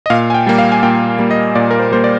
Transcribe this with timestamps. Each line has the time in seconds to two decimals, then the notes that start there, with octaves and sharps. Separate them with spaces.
0.06 D#5
0.10 A#2 F5
0.30 G#5
0.34 G5
0.46 G3 A#3 G5
0.58 F5
0.72 G#5
0.83 A#2 G5
1.19 G3 A#3
1.31 D#5
1.55 A#2 D5
1.71 A#4
1.79 C5
1.92 G3 A#3 C5
2.04 D5